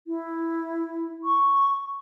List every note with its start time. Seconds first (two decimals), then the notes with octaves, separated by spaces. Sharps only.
0.07 E4
1.24 C#6